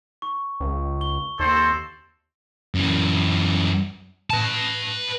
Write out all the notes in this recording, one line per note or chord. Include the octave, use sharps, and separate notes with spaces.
C#6
C#2
C#6 G7
D#2 C4 A4 C5
F#2 E3
B4 A5